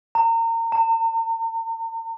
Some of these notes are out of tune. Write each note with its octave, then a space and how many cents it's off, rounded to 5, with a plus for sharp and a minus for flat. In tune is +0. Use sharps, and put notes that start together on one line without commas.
A#5 -30
A#5 -45